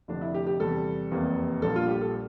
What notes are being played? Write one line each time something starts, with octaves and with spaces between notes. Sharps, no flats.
F1 F2 D3 A3 D4
E4
G4
G4
E2 C3 G3 A4
F1 E2 C3 E3 A#3
A#1 A#2 G3 A#3 A4
F4
G4
A4